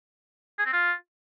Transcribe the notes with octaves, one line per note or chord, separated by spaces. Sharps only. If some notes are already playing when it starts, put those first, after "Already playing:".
G#4
C4
F4